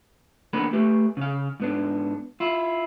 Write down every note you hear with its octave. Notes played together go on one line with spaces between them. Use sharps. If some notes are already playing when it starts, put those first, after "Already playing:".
D#2 A#3 B3 D4 A#4 B5
A3 G4 B4
C#3 F5
G#2 B3 D4
E4 F4